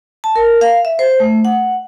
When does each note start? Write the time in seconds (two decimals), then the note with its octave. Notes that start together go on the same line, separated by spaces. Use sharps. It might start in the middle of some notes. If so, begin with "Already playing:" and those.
0.24 A5
0.36 A#4
0.61 F5
0.85 E5
0.99 C5
1.20 A3
1.45 F#5